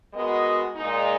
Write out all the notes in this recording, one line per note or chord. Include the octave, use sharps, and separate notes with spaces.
G#3 B3 F#4 A#4 D#5
A#2 G#3 D#4